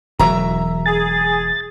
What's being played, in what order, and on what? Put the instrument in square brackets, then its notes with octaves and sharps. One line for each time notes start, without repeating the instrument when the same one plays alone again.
[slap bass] E1 E3 F#3 [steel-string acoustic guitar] E5 A#5
[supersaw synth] G#4 [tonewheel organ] A6